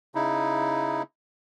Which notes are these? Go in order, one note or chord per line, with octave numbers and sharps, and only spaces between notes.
C#3 D#4 E4